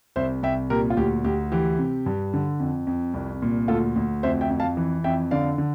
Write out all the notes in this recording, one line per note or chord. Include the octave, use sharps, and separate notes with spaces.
C2 C5 E5
C2 E5 G5
A#2 G4 A#4
F4
D2 G4
D2 G4
E3 G4
C3
G2
D3
F2
F2
C2
A#2
D2 F4 A4
D2
F2 C5 E5
E5 G5
F2
F5 A5
E3
F2 E5 G5
D3 D5 F5
D3